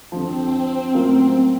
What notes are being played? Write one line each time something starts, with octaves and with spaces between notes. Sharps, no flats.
F2 D3 F3 C4
A2 F#3 A#3 C#4 F4